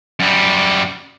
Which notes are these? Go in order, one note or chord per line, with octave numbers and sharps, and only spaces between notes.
F#2 G3